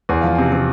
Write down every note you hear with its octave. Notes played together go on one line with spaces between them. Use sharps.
E2 G#5
F3 F5
C3 G#5
C3